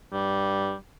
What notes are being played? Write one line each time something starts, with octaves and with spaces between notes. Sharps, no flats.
G2 G3